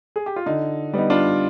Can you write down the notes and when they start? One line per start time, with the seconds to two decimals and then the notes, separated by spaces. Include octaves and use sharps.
0.16 G#4
0.26 G4
0.36 F4
0.46 D3 D#4
0.93 G3 B3 D#4
1.10 D4 F4